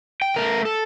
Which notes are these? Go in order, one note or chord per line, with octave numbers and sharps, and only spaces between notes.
G5
A3 A#4
A4